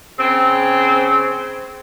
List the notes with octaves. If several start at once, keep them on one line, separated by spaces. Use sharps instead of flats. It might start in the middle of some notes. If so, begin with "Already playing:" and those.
C#3 C4